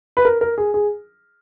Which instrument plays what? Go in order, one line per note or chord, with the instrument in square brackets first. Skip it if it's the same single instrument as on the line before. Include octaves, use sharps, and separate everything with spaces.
[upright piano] B4
A#4
A#4
G#4
G#4